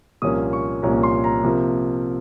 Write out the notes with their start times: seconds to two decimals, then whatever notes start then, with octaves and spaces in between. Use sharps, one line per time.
0.22 C2 A#2 F3 A#3 C#4 D#6
0.53 C#6
0.82 C2 A#2 F3 A#3 C#4 A#5
1.03 C6
1.24 A#5
1.44 C3 F3 A#3